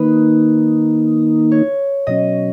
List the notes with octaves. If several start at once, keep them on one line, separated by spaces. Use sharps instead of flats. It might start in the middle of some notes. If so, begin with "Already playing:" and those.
Already playing: D#3 A#3 D#4 B4
C#5
B2 F#3 C#4 D#5